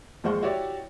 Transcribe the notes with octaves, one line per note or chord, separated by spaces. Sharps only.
D#2 F3 G#3 C5 F#5 C#6
E4 F#4 G4 C#5 D5 E5